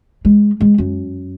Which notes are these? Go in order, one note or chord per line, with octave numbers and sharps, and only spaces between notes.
G#3
G#3
F#2